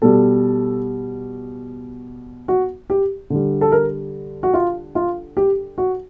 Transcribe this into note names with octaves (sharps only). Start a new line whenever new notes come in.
B2 G3 A4
F#4
G4
D3 G3
A4
A#4
F#4
F4
F4
G4
F#4